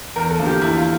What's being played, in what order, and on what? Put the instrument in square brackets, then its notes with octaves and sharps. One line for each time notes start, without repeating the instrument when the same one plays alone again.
[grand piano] E2 A#4
A4
D3 F3 A#3
G4
E2 E4
F4